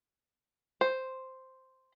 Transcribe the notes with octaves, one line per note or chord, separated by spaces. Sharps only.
C5